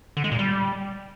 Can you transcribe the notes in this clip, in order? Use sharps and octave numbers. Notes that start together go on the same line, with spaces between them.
D3
G#3
A#2
G3